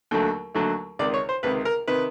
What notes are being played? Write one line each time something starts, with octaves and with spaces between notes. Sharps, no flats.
D#2 D3 F#3 A3
D#2 D3 F#3 A3
C#2 C3 D#3 D5
C#5
C5
C#2 C3 D#3 B4
A#4
C3 D#3 B4